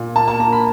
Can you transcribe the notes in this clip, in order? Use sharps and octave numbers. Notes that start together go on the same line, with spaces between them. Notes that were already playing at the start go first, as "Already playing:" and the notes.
Already playing: A#2
A#3 A5
A5
A#3 A#5
B5